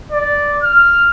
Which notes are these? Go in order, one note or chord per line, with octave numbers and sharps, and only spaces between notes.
D5
F6